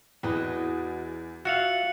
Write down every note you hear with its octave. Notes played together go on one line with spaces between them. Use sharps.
E2 F#4 B4 D#5
F4 F#4 E5 F5 F#6 C#7 F#7